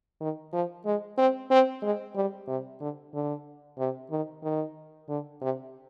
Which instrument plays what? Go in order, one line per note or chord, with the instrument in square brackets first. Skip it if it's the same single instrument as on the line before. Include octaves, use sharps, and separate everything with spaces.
[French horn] D#3
F3
G#3
C4
C4
G#3
G3
C3
D3
D3
C3
D#3
D#3
D3
C3